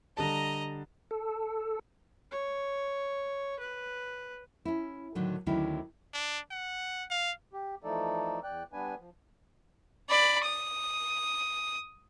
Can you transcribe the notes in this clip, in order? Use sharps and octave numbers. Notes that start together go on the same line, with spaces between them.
D3 G3 D#5 A5 A#5
A4
C#5
B4
C#4 E4
A2 D3 D#3 F#3
D2 D3 D#3 F#3 C#4 E4
D4
F#5
F5
G4
E3 F3 A3 D#4 A4 D5
E2 D5 G5 F#6
G3 B3 D4 B4 G#5
F3
D5 B5
D#6